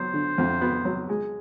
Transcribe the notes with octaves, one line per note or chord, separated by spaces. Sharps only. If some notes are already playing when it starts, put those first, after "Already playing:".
Already playing: F#3 B3 C5
D3
F2
B3
F#3
G#3